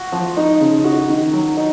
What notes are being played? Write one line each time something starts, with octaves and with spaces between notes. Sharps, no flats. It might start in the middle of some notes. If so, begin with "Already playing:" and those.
Already playing: F#4
F3
D#4
C#3
F#4
D#3
F#3
D#4